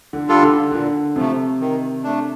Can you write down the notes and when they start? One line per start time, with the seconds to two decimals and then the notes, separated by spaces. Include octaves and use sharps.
0.13 D3
0.28 G3 D4 F4 A4
0.43 D3
0.72 A#2 D3
1.16 C3 F3 A3
1.61 D#3
2.04 A3 D4